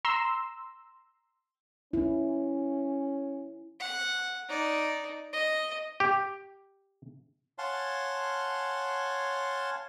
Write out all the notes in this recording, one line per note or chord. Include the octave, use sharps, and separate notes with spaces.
A#5 C6 E6
C#4 E4
F#5
D#4 D5
D#5
G4
C#5 F5 F#5 G#5 A5 C6